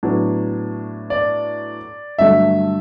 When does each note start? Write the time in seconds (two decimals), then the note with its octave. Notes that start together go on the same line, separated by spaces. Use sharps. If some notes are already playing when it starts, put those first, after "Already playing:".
0.03 A2 F#3 B3 D4
1.10 D5
2.18 G2 D3 F#3 A3 E5